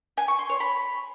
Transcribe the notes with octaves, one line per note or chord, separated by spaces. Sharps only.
G#5
C#6
C6
C#5
B5